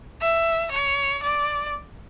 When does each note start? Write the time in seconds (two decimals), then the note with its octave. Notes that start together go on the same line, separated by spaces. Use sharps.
0.21 E5
0.71 C#5
1.23 D5